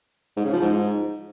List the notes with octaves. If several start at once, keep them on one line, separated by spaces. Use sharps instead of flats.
G#2
C#3
F3
G#2